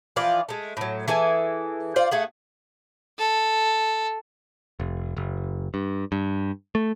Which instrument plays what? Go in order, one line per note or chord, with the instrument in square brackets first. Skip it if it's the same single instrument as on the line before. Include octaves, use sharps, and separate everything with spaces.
[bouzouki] E3 F3 F4 D5
G#3 A3
A2 F#3
E3 G#4 A4 G#5
F4 C5 D5
A3 G#4 F#5
[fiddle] A4
[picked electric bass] F1
F#1
G2
G2
A3